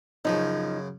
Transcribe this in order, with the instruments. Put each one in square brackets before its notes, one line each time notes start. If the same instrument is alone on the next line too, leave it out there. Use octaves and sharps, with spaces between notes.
[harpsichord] F#2 C#3 [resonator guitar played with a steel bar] F3 D#4